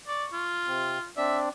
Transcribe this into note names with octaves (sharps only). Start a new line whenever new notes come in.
D5 C#6
F4
C3 C4
C4 D4 D5 E5